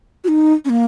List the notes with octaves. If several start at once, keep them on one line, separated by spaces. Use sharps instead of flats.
F#4
D#4
C#4
A#3